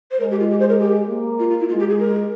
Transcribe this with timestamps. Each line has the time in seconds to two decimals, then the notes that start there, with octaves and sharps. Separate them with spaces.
0.11 C5
0.20 G#3 A#4
0.31 G4
0.40 F4
0.50 G4
0.60 C5
0.69 A#4
0.79 G4
1.09 A#3
1.39 F4
1.50 F4
1.60 E4
1.69 G#3 F4
1.79 G4
1.90 G#4
1.99 A#4